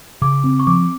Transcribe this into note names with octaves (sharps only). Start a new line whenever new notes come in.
C#3 D6
C4
C#6
F3 D6